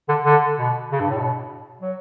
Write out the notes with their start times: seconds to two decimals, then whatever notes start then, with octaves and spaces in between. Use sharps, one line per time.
0.09 D3
0.25 D3
0.59 B2
0.92 C#3
1.00 G2
1.10 A2
1.18 B2
1.81 F#3